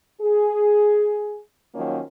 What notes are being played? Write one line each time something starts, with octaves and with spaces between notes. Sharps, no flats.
G#4
D#3 F3 F#3 A#3 C#4